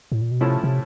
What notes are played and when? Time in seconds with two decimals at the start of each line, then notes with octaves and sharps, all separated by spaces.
0.12 A2
0.21 A#2
0.31 B2
0.41 A2 C3 F3 A3 C#4 E4
0.63 C3